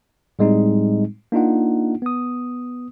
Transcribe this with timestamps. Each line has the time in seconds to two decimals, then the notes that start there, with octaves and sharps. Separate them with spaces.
0.39 A2 G3 G#3 C4 D#4
1.32 A#3 D4 D#4 F4 F#5
2.02 B3 D#6